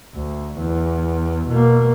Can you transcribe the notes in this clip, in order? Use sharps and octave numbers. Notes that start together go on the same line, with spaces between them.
D2
E2
B2 A#3